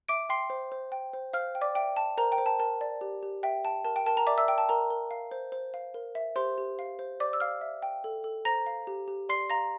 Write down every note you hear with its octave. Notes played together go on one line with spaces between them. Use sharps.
E5 D6 D7
G5 C6 C7
C5
C5
G5
C5
C5 F5 F6
G5
D5 D6
E5 G5
G5 A5
A#4 C5 A#5
G5
C5
A5
A#4 A5
D5
G4
G4
E5 G5
G5 A5
A#4 A5
G5
A#4 A5
A#4 A#5
D5 E5 D6
E5 E6
G5
A5
A#4 A#5
A#4
F5
C5
C5
F5
A#4
E5
G4 C5 C6
G4
F5
C5
C5 D5 D6
E6
F5 F6
E5
G5
A4
A4
C5 A#5 A#6
F5
G4
G4
D5 C6 C7
F5 A#5 A#6